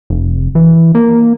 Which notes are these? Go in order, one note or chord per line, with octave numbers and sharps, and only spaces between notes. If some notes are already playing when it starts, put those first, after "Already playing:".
F1
E3
A#3